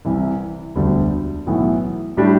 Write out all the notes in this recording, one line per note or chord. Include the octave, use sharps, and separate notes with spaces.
C2 C3 E3
E1 D2 D3 G3 D4
B1 A2 E3 B3
A2 G3 D4 G4